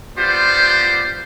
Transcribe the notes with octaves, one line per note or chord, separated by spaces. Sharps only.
B3 F4 G4 C5 D5